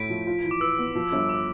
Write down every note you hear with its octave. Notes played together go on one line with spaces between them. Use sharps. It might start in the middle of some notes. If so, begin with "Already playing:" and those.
Already playing: A2 A3 E4 B6 D7
F3
F4
E3
D6
B4 E6
B3
F3
G1
D6